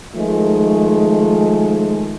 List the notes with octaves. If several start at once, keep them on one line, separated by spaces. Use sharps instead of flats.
D#3 F3 G#3 A3